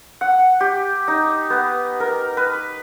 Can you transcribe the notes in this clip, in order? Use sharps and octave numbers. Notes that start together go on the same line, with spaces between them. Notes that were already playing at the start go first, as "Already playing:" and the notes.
F#5
G4
D#4
B3
A#4
B4